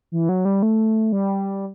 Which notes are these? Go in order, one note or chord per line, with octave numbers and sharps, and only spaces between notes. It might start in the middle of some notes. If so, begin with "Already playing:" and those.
E3
F#3
G3
A3
G3